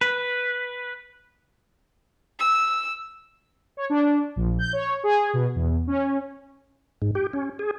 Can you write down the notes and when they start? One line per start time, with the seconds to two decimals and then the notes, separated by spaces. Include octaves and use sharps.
0.01 B4
2.39 E6
3.77 C#5
3.90 D4
4.36 A#1
4.59 G6
4.73 C#5
5.04 G#4
5.33 B2
5.55 E2
5.87 C#4
7.02 G#2
7.15 G4
7.33 C#4
7.59 G#4